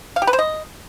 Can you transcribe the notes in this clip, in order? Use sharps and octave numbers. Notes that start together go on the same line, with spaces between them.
F5
G4
B4
C5
D#5